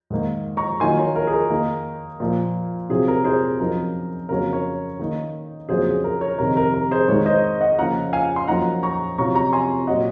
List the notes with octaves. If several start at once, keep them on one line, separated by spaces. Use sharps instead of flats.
G#2 D#3 A#3
A#5 C#6
D#3 F#3 A#3 F4 G#5 C6
A#4 C#5
A#4
G#4
A#4
D#3 A#3 D#4
A#2 F3 A#3 F4
C3 F#3 C4 F4 G#4
A#4
G#4 C5
F#2 F3 C4 D#4 A#4
F2 C#3 F#3 A#3 C#4 A#4
A#4 C#5
D#3 A#3 D#4
F2 C#3 F#3 A#3 F4 G#4 C5
G#4
A#4
A#4 C#5
F2 C3 D#3 A#4
A#4
A#4
G#4 C5
G#2 D#3 G#3 D#4 A#4 C#5
C5 D#5
D#5 F#5
C#3 F3 A#3 C#4 F4 F#5 A#5
F5 G#5
C6
F#2 F3 A#3 D#4 F#5 A#5
A#5 C#6
C3 F#3 C#4 F4 A#5 C#6
A#5 C#6
G#5 C6
A#2 F#3 C#4 D#5 F#5